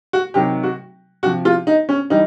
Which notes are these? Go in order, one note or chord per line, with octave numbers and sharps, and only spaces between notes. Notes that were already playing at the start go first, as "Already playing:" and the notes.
F#4
C3 D#3 F#3 G4
F#4
C3 F3 F#4
F4
D#4
C#4
E3 G3 D#4